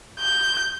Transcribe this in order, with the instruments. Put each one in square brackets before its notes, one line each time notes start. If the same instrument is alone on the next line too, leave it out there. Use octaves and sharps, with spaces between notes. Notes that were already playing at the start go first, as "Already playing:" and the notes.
[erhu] G6